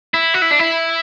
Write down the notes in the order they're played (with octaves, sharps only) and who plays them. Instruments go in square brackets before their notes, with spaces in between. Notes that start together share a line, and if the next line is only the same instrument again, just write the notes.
[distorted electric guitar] E4
F#4
E4
D4
E4